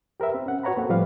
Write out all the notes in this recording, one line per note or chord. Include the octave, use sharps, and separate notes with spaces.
G4 A#4 B4 E5
C4
C#4 F#5
F#4 B4 C#5 F#5 A#5 B5
A#3 C4 A4
A2 F3 G3 B4 D5 F5